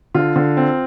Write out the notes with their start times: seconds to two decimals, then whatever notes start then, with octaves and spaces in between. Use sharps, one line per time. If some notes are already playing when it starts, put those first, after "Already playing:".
0.14 D3 F4
0.36 D3
0.57 C4